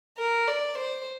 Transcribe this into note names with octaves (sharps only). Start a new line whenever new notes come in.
A#4
D5
C5